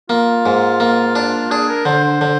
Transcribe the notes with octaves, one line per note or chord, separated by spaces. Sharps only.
A#3 F4
G#2
A#3
D4
D4 G#4
A#4
D3 C5
C5
D3